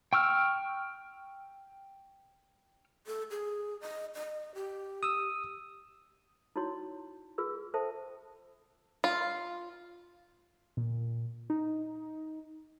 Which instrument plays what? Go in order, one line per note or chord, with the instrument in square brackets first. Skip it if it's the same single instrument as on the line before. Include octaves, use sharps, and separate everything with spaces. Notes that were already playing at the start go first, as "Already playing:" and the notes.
[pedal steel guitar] G5 C#6 E6 F6
[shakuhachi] A4
G#4
D#5
D#5
G4
[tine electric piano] D#6 E6
[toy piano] D#4 E4 F#4 C#5 C6
F4 G#4 B4 E6
A4 C5 E5 G5 A5
[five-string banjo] F4
[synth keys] A#2
D#4